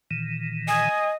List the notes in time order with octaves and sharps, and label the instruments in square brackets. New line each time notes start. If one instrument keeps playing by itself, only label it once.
[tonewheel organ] A#2 D#3 E3
[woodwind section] D#5 [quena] G#5